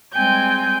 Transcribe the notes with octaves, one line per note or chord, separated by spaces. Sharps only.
G3 G#3 C4 G5 G#5 G6